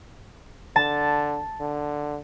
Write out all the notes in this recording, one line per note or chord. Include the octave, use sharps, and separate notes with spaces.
D3 A5
D3